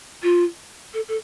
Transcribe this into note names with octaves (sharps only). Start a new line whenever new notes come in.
F4
A4
A4